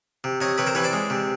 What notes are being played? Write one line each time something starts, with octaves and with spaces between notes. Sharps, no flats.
C3
C3 C#5 D#5
C3 B4 C#5
A#4 C5
E3 B4 C#5
C5 D5
G#3
C3